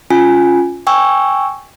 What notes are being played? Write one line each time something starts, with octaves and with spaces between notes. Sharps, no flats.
C#4 F4 G#5
G5 G#5 C#6 E6